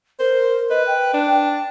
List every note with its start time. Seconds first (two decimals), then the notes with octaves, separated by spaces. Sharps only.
0.19 A#4 C5
0.70 B4 D#5
0.87 G5
1.13 D4